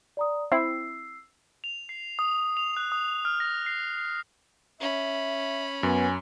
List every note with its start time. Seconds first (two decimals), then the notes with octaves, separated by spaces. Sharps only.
0.17 D5 A#5 D#6
0.52 C4 E4 E6 C7
1.64 F7
1.89 C7
2.19 D#6
2.57 F7
2.77 F#6
2.92 D#6
3.25 F6
3.40 A#6
3.66 C7
3.97 C7
4.80 C#4 E5 B5
5.83 F#2 B3 G#5